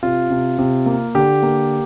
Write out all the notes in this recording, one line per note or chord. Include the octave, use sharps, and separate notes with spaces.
C3 F4
C3
C3
A#3
D3 G4
A#3